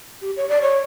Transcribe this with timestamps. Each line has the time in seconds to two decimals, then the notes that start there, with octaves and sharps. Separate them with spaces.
0.22 G4
0.37 C#5
0.49 D5
0.62 C#5